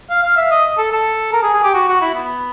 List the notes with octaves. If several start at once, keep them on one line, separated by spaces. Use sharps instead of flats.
F5
F5
E5
D#5
A4
A4
A#4
G#4
G#4
G4
F#4
F#4
E4
B3